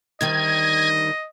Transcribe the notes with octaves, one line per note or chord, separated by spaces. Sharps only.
D2 D#3 G3 D#5 G#6